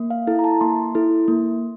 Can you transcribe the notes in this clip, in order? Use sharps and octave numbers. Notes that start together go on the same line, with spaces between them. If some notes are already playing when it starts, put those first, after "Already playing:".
Already playing: A#3
F5
E4 A4
A#5
A5
A#3 C6
E4 A4
A#3